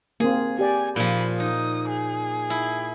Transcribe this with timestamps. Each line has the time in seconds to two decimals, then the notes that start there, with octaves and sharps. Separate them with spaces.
0.20 A#3 C4 G#4
0.59 G4 D5 G#5
0.96 A#2 F3 B5
1.40 D#4 D#6
1.88 G#4
2.50 E4